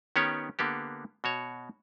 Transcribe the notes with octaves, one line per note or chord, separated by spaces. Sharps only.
D#3 B3 C#4 G4 C#5
D3 A#3 B3 G4
B2 F#4 C#5